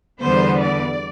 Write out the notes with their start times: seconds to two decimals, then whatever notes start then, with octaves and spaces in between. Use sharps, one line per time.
0.20 E2 D3 G3 B3 C5
0.61 D5